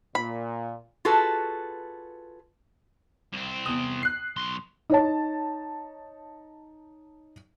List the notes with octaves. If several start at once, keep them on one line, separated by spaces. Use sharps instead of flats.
A#2 B5
F4 F#4 G#4 A4 B4
C2 C4
E2 D#6
F#6 C7
B1 C6
D#4 C#5 A5